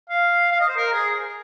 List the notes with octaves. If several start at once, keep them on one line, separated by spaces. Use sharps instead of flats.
F5
F5
D#5
C5
A#4
G#4